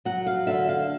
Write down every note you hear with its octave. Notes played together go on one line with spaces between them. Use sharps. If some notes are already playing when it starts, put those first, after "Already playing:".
F#3 F#5
F5
D3 E5
F5